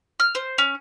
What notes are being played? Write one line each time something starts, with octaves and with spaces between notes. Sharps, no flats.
F6
C5
C#4